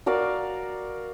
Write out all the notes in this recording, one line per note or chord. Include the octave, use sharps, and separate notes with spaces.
F#4 A#4 D5 F5